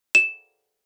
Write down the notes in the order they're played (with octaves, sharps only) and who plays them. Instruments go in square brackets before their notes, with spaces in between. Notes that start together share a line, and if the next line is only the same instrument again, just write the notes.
[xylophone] E7